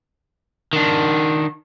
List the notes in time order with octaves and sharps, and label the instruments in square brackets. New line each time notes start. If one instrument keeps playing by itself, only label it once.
[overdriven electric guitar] D#3 D4